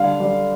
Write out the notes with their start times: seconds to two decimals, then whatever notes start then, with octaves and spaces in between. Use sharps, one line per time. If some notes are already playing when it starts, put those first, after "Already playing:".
Already playing: D3 G3 F5
0.20 G3